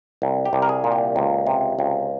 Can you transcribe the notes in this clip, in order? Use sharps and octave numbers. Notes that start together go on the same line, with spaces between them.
C2
G4
C2
A#4
G#4
A#2
G4
C#2
C3
C#2